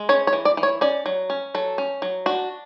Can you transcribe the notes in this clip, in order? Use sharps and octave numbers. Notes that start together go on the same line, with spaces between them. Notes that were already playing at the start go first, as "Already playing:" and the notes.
Already playing: G#3
C#4 C#5
C#5
E3
D5
E3
C#5
C#4 D5
F#3
C#4
F#3 A4
C#4
F#3
D4 F#4